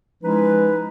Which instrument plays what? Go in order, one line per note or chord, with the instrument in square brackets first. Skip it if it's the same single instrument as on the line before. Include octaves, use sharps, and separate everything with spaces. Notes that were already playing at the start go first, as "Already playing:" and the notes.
[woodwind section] F3 G#3 C#4 D#4 E4 B4